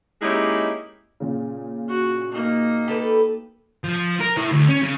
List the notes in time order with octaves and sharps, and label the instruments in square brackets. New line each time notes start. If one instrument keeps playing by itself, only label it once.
[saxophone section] G#3 A#3 C#4 D#4 E4 G4
[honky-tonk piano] A#2 C#3
[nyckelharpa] F#4
A#3 D#4
[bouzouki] G4 A4 B4
[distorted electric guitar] F3
A#4
E4 C#5
D2
C#4
C#3